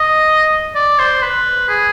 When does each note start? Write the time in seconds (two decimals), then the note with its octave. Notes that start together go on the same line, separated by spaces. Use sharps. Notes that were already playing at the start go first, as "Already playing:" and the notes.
Already playing: D#5
0.75 D5
0.99 C5
1.22 B4
1.69 G#4